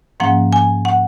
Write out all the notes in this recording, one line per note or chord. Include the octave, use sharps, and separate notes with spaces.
G#2 F3 A#3 C#4 F#5
G#5
F#5